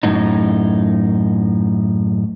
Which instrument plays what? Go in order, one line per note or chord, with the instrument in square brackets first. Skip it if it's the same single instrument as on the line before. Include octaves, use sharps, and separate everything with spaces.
[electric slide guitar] F#2 A2 D#4